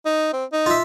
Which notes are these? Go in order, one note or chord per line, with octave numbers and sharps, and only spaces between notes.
D#4
C4
D#4
F4 E5